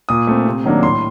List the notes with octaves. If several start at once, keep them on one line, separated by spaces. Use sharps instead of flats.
A#2 D#6
A3 C4
C3
D#3 F#3 A#3 D4
A2 C6